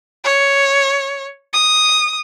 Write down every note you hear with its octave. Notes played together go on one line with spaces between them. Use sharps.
C#5
D#6